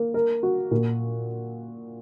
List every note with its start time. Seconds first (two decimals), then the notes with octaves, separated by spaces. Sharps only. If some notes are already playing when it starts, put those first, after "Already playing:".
Already playing: A#3
0.14 A#4
0.43 F#4
0.71 A#2